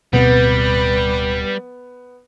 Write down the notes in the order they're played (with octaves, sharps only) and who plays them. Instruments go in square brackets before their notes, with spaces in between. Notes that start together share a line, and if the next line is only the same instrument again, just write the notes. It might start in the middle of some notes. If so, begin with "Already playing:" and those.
[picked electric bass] D1 B2 C4 [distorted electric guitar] G3 [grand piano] B3 [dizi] B4